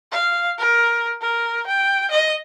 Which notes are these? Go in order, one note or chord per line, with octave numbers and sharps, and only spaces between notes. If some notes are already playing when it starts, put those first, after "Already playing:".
F5
A#4
A#4
G5
D#5